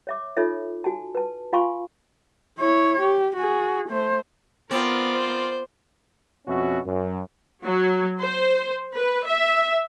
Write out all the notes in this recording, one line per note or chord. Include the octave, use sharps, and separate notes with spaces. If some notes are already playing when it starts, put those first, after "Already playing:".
C#5 E5 D6
D#4 F4 A4 C#5 E5
F#4 G#5 A5
B4 A5
F4 F5 G#5 C6 C#6
E4 C#5
G4
F#4 G#4
A3 C5
B3 C4 F4 A#4 D5
C5
F2 B2 C#4 F#4 E5
F#2
F#3
C5
B4
E5